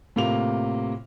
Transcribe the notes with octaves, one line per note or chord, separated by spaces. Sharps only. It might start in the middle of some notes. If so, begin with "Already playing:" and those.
A2 C3 A#3 F4 F7